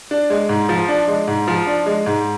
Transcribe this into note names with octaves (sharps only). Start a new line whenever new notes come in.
D4
G#3
G#2
F3
D4
G#3
G#2
F3
D4
G#3
G#2